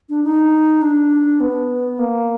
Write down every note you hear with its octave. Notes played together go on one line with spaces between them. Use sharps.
D4
D#4
D4
B3
A#3